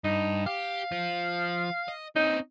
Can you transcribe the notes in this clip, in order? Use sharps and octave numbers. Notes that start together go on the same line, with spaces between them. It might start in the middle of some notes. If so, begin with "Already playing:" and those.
G2 D#4
G4 F5
F3
D#5
C4 C#4 D#4